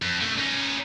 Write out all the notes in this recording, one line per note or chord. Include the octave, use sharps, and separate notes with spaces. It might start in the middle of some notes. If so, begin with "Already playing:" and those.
F2
F#2 A3
C#4 D#4